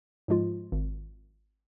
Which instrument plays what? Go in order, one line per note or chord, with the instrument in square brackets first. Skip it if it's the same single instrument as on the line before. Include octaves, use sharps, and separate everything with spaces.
[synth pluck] G#2 F3 G#3 F4
G#1